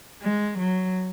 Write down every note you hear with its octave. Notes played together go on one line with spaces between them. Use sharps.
G#3
F#3